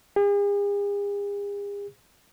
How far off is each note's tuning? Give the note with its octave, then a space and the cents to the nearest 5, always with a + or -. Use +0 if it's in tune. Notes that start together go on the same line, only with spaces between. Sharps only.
G#4 -45